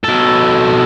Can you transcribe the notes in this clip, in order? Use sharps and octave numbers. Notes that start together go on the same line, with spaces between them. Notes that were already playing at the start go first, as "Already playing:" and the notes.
B2 A4